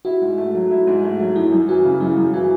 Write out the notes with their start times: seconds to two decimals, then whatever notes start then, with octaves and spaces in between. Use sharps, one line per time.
0.05 E4 F#4
0.22 G#2
0.38 A3
0.55 F#3
0.71 E4
0.87 G#2
1.03 A3
1.19 F#3
1.36 F#2 E4
1.52 F#2
1.68 E3 F#4
1.85 C#3
2.00 F#2 E4
2.17 F#2
2.33 E3 F#4